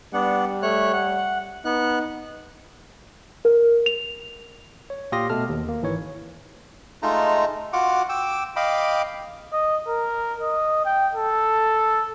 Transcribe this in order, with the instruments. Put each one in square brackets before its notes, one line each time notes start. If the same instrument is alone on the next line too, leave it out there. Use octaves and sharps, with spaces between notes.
[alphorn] G3 [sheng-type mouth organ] B3 D4 F#5
[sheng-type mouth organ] A3 C#5 F#6
F#5
[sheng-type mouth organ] B3 F#6 [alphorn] D#4
[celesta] A#4
F7
[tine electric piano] C#5
A#2 G4 F5 C6 D#6 A#6
B2 A3 A4 A5 F6
D#2
A#3
G#1 E3 D#4 C#5
[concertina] G#3 A3 D#4 F4 A#5
F4 F#4 F#5 D6
G5 D6 E6
D#5 F5 G5 B5 D6
[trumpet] D#5
A#4
D#5
G5
A4